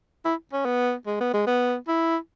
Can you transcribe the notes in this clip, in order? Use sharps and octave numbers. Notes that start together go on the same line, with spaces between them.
E4
C#4
B3
G#3
B3
G#3
B3
E4